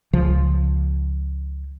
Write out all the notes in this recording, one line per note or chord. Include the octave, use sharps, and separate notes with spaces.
C#2 C#3 F3